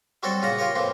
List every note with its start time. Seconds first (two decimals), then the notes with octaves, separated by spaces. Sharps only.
0.23 F#3 G3 C4 F#4 G4 A4
0.42 A#2 C#3 A#3 F#5 A#5
0.59 F4 G4 A#4 C#5
0.75 F2 A2 E3 A#3 C4